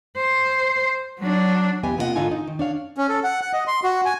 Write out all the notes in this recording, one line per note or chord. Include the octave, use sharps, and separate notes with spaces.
C5
F#3 D4
E2 B3 G4 D#5 G#5
C3 A#3 F4 G4 D#5 F#5
G#2 D3 D#4 F4 A4 G#5
D#4
D#3
D4 C#5 F5
C#4
A4
F#5
F#5
D#5
C6
F#4
G#5